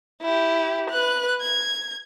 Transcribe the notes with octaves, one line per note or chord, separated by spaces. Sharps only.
E4 G4
B4 F#6
G#6